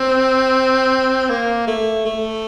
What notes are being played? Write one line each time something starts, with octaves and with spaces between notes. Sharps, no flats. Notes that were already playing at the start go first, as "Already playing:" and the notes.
Already playing: C4
A#3
A3
A3